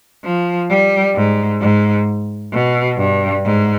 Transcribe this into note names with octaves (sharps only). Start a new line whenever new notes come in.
F3
G3
G#2
G#2
B2
G2
G#2